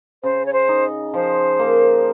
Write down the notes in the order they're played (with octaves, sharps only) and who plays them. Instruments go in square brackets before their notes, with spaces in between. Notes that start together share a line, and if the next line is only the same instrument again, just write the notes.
[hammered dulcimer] C#3 [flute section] C5
[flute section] C#5
C5
[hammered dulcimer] D#4
[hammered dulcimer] F3 [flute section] C5
[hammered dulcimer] A#3